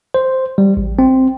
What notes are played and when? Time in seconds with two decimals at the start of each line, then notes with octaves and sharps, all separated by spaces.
0.14 C5
0.58 G3
0.77 A1
0.99 C4